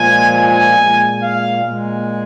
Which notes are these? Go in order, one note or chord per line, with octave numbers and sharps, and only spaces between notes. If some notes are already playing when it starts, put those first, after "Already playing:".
Already playing: A#2 F3 G#3 G#5
G#5
A#2 G#3
F5
A#2 G#3